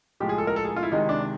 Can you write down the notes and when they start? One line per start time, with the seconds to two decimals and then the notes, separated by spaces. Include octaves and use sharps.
0.20 A2 F3 G#3 G4
0.29 G#4
0.38 A4
0.47 A#4
0.56 A4
0.65 G#4
0.76 F4
0.83 E4
0.92 C3 D#3 G#3 D#4
1.09 D4